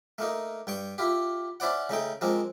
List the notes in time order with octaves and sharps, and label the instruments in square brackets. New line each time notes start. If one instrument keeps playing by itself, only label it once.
[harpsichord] A3 A#3 D#4
G2 G5 C#6
E4 F4 G4
C#4 E4 C5 D5 F#5
C#3 A3 D#4 G5
F3 G#3 A#3 C4